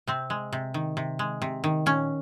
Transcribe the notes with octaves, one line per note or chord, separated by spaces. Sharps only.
C3 C4
G#3
C3
D#3
C3
G#3
C3
D#3
A#2 C#4